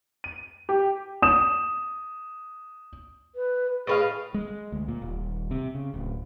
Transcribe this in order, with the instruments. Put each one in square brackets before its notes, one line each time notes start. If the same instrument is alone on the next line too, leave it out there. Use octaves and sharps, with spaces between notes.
[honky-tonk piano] D#7
G4
[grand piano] D#6 E7
[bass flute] B4
[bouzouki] A2 B4 F5 [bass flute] G#4
[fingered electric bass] G#3
D2
A#2
D#1
C3
C#3
D1